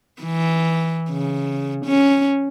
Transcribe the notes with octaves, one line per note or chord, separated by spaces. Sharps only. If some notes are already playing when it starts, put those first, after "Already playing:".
E3
C#3
C#4